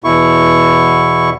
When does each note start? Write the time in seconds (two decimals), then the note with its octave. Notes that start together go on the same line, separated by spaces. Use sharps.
0.04 E2 B2 E4 C#6